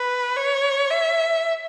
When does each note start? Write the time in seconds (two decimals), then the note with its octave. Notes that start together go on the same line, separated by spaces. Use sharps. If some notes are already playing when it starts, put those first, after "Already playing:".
Already playing: B4
0.37 C#5
0.90 E5